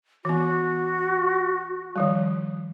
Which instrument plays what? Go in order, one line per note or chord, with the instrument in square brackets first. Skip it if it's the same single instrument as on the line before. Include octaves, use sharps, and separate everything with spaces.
[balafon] E3 B3 [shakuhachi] F#4
[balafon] D#3 F3 G3